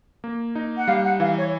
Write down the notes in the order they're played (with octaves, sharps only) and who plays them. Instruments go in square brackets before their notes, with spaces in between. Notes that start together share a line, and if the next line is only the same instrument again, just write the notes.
[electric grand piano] A#3
D#4
[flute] F#5
[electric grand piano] G3 [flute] F5
[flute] F#5
[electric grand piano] E3 [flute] F5
[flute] C#5